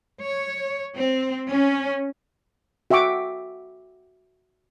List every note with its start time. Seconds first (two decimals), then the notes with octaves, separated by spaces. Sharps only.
0.21 C#5
0.95 C4
1.51 C#4
2.90 F#4 E5 G5 C#6 D6